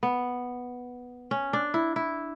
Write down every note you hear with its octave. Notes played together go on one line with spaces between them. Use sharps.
B3
C#4
D4
E4
E4